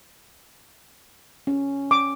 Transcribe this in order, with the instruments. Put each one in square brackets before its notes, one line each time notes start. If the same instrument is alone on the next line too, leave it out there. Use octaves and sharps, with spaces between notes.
[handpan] C#4
[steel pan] D6